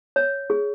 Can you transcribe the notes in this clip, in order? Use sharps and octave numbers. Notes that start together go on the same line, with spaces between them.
C#5
G#4